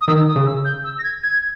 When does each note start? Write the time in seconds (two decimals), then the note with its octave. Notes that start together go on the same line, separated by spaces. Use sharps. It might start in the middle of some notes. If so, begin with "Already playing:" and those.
0.01 D#6
0.07 D#3 E6
0.27 D#6
0.36 C#3
0.46 E6
0.64 G6
0.84 E6
0.98 A#6
1.03 G#6
1.22 G#6